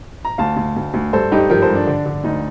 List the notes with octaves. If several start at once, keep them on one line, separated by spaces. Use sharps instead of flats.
A#5
D2 F5 A5
D2
D2
D2
G2 A4 C5
G2 D#4 G4
F3 G4 A#4
A4 C5
G2
D4
D3
D3
D2 D#4